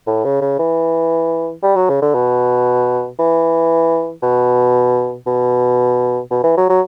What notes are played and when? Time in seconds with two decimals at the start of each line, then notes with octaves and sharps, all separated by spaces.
0.07 A2
0.25 C#3
0.41 C#3
0.59 E3
1.63 G3
1.76 F#3
1.89 C#3
2.02 D3
2.15 B2
3.19 E3
4.23 B2
5.27 B2
6.31 B2
6.44 E3
6.57 F#3
6.69 F#3